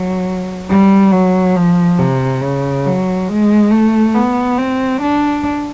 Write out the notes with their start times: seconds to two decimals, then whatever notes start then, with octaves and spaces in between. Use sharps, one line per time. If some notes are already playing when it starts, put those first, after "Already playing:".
Already playing: F#3
0.69 G3
1.12 F#3
1.56 F3
1.99 C3
2.41 C#3
2.86 F#3
3.28 G#3
3.71 A3
4.15 B3
4.58 C4
5.02 D4